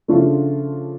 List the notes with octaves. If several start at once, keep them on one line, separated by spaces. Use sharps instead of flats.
C#3 F3 A3 D4 F4